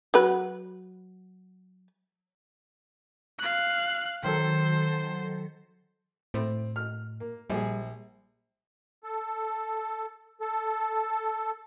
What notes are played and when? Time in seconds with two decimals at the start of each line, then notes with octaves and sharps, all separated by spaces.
0.14 F#3 B4
3.39 F5 F#6
4.23 D#3 F#3 A4 C5
6.34 A2 C4
6.76 F6
7.20 A#3
7.50 A#1 G3 G#4
9.04 A4
10.41 A4